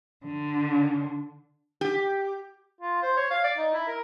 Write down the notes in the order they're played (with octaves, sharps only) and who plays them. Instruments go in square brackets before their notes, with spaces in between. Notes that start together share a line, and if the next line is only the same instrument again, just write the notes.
[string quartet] D3
[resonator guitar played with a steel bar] G4
[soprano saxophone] F4
C5
C#5
F5
D5
D#4
E4
A#4